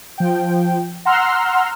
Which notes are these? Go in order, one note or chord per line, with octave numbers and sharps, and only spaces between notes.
F3 G5
F#5 A#5 C6 E6 F6